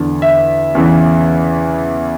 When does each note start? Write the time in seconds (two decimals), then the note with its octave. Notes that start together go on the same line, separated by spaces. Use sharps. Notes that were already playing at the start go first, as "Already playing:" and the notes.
Already playing: E2 D3
0.22 E5
0.75 E2 C#3 E3